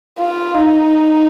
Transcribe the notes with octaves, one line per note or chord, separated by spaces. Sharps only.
F4
D#4